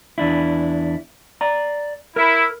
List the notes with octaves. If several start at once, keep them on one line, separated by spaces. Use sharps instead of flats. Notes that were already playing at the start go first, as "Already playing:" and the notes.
E2 D4 E4
D5 A#5
E4 A#4